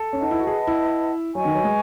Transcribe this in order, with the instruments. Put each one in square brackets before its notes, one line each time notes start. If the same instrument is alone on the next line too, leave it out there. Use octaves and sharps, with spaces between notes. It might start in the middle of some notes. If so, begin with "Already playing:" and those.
Already playing: [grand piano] A4
C#4
[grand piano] D#4 [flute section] B4 D#5 F#5 A5
[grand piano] E4
F#4
G#4
E4
[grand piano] F#3 [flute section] B4 D#5 G#5 C#6
[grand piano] D#3
F#3
G#3